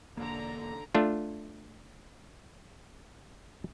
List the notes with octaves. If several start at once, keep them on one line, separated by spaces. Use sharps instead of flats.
E1 D3 A#3 A#5
A3 D4 F4